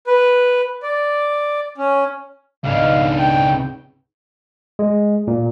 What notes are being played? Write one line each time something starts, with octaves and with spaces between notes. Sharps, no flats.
B4
D5
C#4
C#2 G#2 C#3 B3 D4 F5
G5
G#3
A#2